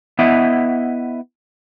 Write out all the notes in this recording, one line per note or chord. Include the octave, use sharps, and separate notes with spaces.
B3 E4 D#5 E5 F#5